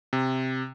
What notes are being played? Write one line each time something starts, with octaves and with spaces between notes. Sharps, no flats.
C3